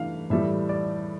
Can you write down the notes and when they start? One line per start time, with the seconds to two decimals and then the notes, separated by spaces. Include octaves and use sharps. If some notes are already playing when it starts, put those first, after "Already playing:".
Already playing: G2 E3 A3 F5
0.30 A2 E3 G3 E5
0.69 D5